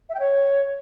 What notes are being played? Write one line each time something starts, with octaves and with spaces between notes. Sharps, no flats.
E5
G5
C#5